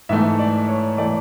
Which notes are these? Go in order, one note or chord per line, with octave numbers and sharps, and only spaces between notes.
G#2 E3 A3 E5
D5
C#5
E3 A3 D5